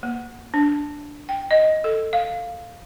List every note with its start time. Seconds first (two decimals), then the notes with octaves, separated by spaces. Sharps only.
0.03 A#3
0.54 D4
1.29 G5
1.51 D#5
1.84 A4
2.13 F5